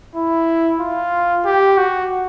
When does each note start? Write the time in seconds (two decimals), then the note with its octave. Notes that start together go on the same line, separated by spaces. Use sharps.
0.15 E4
0.80 F4
1.45 G4
1.78 F#4